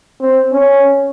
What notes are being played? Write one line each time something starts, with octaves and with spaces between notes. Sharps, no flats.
C4
C#4